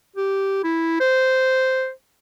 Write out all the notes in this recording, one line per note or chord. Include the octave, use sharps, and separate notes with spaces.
G4
E4
C5